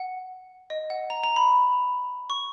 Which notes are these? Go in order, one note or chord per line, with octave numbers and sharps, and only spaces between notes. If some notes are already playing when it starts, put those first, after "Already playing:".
Already playing: F#5
D#5
F#5
A#5
A#5
B5
C#6